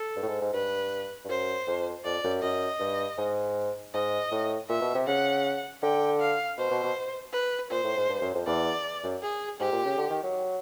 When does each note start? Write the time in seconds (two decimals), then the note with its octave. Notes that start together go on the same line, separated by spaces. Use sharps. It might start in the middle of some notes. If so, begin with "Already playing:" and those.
Already playing: A4
0.17 G2
0.23 A2
0.28 G#2
0.41 G#2
0.53 G2 B4
1.25 G2
1.29 F#2 C5
1.67 F2
2.05 F2 D5
2.24 F#2
2.42 F#2 D#5
2.80 G2
3.18 G#2
3.94 G#2 D#5
4.31 A2
4.69 A#2 E5
4.82 B2
4.95 C3
5.07 C#3 F#5
5.83 D3 G5
6.20 F5
6.58 B2 C5
6.70 B2
6.83 B2
7.33 B4
7.71 A#2 C5
7.84 A2
7.97 G#2
8.09 G2
8.21 F#2
8.34 F2
8.46 E2 D5
9.03 F#2
9.22 G#4
9.60 G#2 G4
9.72 A#2
9.85 C#3
9.98 D3
10.10 D#3
10.23 F#3